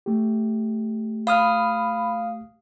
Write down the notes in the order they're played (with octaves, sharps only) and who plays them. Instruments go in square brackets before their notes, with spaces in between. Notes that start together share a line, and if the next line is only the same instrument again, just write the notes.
[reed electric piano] A3 G4
[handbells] F5 D#6 F6 [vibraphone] B5